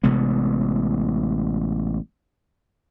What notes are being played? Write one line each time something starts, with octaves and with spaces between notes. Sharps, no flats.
A1 C3 G#3 B3